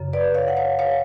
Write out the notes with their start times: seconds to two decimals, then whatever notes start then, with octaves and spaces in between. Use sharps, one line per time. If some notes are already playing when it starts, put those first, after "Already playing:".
Already playing: F#2 C#3
0.13 B4 D5
0.35 C#5 F5
0.48 F#5
0.57 C#5 F5
0.79 C#5 F5